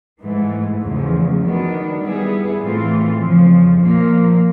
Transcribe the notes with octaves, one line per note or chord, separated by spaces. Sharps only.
G#2 E3 A3
E2 C#3 F3 A3
D#3 F#3 B3 D4
G3 B3 E4 G#4 B4
A2 E3 A3 C4 F4
F2 C#3 F3
A#2 F3 A#3